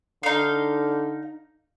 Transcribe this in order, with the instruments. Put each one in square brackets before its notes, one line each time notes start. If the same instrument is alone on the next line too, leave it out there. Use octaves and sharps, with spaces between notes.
[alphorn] D3 [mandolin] D#4 F5